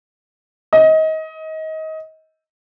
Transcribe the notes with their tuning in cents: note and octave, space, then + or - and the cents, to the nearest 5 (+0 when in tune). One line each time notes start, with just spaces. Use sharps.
D#5 +25